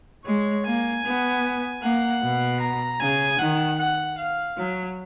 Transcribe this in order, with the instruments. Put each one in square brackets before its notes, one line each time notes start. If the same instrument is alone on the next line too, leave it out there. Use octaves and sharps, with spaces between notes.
[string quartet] G#3 [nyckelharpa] C#5
[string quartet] A#3 [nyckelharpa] G#5
[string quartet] B3
[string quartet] A#3 [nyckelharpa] F#5
[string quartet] B2
[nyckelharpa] A#5
[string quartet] C#3 [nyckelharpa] G#5
[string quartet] D#3 [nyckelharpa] F#5
[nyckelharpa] F#5
F5
[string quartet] F#3